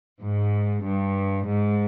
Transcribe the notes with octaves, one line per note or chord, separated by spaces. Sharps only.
G#2
G2
G#2